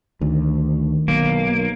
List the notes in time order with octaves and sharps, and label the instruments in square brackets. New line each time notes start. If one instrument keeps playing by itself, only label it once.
[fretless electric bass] D2 [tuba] D#3
[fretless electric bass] B1 [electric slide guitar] A#3